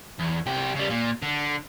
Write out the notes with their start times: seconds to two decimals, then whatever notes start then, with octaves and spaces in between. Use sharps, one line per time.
0.20 E2
0.46 C2 G4
0.75 C#3 G3
0.90 A#2
1.23 D3